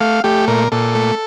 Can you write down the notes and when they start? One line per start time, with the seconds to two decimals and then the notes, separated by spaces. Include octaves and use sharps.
0.01 A3 F5
0.24 A3 G4
0.48 A#2 A#4
0.72 A#2 A4
0.95 A3